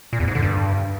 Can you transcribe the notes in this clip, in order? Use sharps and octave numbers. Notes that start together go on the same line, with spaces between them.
A#2
E2
G#2
D3
G2